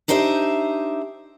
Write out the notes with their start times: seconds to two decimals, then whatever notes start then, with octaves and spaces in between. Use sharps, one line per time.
0.08 D4 D#4 G4 C5 E5